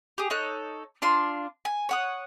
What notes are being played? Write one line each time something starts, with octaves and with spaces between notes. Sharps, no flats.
G4 G#4
D#4 A4 C#5 F#6
D4 F4 C6
G#5
C#5 F#5 D#6